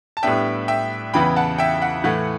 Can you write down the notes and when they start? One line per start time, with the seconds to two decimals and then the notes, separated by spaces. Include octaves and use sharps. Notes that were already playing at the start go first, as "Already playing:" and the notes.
0.17 A5
0.23 A2 G3 B3 D4 E5 G5
0.68 E5 G5
1.14 E2 C#3 E3 B3 E4 G5 B5
1.36 F#5 A5
1.58 E5 G5
1.82 F#5
2.04 A2 E3 A3 F#5